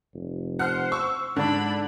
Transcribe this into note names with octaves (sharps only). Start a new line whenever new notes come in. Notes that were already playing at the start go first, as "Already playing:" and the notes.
F1
C5 F#5 F6
C#6 E6
G#2 D3 D4 B5